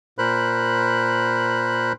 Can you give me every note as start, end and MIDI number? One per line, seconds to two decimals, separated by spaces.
0.18 1.93 46
0.18 1.93 70
0.18 1.93 72
0.18 1.93 83
0.18 1.93 90